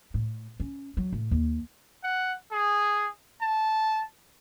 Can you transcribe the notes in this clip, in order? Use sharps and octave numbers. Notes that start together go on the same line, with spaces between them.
A2
C#4
F#3
A2
D#2
F#5
G#4
A5